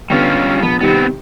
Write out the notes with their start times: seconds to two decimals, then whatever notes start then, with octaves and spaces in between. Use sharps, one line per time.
0.10 D3 G3 B3 C#4 F4 G4
0.62 A#1 B3
0.81 C3 D#3 G3 B3 C4